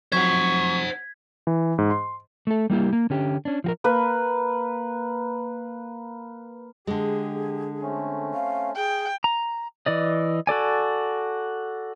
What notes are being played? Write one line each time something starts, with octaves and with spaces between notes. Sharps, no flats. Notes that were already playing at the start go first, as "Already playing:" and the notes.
F2 F#3 C5 F#5 C#6 G#6 B6
E3
G#2
C6
A3 A4
G3 A#3 E4 G4
A#3
D3 C#4 G4
C#4 D4
F3 F#4 A#4
A#3 B4
D3 G#3 G4 G#4
A3 C4 C#4
F5
G#4 G5
A#5
E3 D5 D#5
F#4 A4 D5 G#5